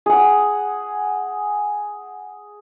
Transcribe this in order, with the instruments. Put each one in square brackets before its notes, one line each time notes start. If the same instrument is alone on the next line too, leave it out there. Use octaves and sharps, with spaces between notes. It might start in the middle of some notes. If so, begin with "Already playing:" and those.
[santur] G#4 F#5